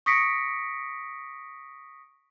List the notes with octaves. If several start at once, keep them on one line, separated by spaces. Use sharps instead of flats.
C#6 D#6 A#6 B6 C#7 D7